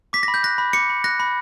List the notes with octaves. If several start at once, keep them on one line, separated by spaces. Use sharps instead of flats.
D6 B6
A#6
B5
G6
F#6 A#6
B5
D6 C#7
B5
F#6 A#6
B5